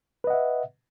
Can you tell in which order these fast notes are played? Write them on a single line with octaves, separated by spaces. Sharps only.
B4 D#5 F#5 E5